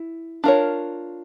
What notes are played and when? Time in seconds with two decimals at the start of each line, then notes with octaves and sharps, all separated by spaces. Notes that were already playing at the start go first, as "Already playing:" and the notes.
Already playing: E4
0.44 D4 F4 A#4 C#5